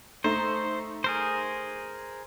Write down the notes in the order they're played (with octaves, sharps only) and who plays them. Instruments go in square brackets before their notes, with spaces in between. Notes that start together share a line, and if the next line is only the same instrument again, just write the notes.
[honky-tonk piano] A3 D#4 [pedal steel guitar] C5
[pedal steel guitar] G#4 A#4 C5